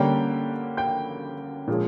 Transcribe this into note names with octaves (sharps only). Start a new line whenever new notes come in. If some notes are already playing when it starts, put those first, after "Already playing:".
Already playing: D3 G3 A#3 C#4 G5
G5 G6
A#2 F3 G#3 C#4